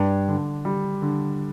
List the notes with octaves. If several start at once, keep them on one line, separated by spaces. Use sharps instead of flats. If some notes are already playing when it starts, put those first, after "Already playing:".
Already playing: G2 D4
D3
G3
D3